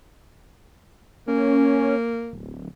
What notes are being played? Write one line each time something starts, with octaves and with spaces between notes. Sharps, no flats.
A#3 C#4
D1